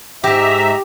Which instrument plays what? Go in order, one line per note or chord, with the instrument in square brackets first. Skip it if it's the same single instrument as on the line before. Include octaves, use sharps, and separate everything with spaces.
[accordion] G#2 E5 [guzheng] G4 [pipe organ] A#5